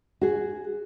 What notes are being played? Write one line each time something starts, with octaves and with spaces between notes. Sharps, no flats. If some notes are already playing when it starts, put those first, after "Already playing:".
F#4 G#4